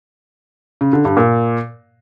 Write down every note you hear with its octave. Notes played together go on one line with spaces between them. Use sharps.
C#3
D3
G2
A#2